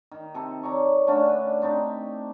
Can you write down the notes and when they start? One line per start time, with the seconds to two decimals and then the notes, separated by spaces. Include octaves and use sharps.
0.11 D#3
0.34 C3 C4 A4
0.63 C#5 D5 A#5
1.07 D3 A3 C#4 D4
1.29 B4
1.62 C4 D4 D#4 G4